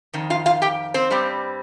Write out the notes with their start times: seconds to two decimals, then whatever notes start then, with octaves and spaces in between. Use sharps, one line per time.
0.14 F2 D#3
0.30 F4 F5
0.46 F4 F5
0.62 G4 G5
0.94 C4 C5
1.10 G2 G3 C4